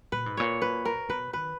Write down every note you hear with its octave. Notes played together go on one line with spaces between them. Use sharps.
A#2 B4
G#2
A#2 C#5
B4
A#4
B2 B4
D#3 B4